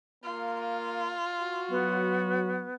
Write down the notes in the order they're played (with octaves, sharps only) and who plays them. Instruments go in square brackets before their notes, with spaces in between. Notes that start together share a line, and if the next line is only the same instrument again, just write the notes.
[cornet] A#3 [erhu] F4
[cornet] F#4
[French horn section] F#3 [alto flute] B3